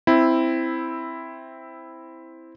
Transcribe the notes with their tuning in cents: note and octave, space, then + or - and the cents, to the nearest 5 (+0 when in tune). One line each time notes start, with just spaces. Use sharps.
C4 +0 E4 +0